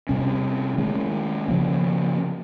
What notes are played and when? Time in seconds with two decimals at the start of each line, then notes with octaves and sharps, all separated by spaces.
0.09 C3 G3 C#4
0.78 D#3 G#3 C#4
1.48 C#3 F3 A#3